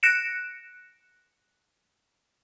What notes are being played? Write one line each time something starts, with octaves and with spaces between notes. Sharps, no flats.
F#6 A#6 C#7 D7 E7